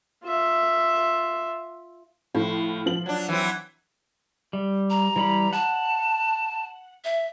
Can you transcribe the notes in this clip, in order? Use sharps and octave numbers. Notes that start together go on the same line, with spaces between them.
F4 E5
A2 F3
F3 F#7
F#3 D4
E3 F#3 C4
G3
A#5
E3 G3 B5
F#5 A5
E5